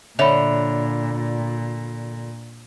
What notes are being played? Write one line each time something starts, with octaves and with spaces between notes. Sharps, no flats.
A#2 D3 C#5 E5 B5 F7